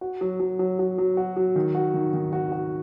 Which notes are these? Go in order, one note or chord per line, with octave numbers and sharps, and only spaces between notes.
F#4
F#3
F#3
F#3
F#3
F#3
F#4
F#3
D#3
F#4
D#3
D#3
F#4
F#4